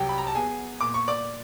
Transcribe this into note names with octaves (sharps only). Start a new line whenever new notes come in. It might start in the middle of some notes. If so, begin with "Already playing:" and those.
Already playing: C2 F#3 G4 G5
B5
A#5
A5
B3 G#4 G#5
A#2 D6
C#6
D5 D6